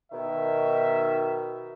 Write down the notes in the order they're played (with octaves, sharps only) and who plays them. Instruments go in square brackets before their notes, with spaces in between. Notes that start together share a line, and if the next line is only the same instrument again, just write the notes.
[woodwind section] B2 D#3 [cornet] E5